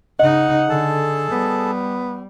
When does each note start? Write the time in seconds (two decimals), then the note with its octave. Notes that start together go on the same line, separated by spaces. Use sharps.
0.19 C#3 D#4 D#5 F#5
0.69 D3 G#4 A4 A5
1.31 G3 B3